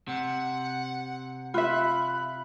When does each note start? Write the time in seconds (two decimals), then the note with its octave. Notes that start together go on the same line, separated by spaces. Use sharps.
0.07 C3 F#5
1.54 F4 E5 B5 F#6